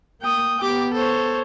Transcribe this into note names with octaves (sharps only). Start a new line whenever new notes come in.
A#3 G5 D#6
B3 G4 D6
A4 C5 C#5